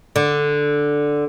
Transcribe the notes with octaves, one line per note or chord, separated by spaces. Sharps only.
D3